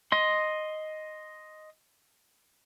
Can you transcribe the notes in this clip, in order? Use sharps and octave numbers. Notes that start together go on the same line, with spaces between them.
D#5 C6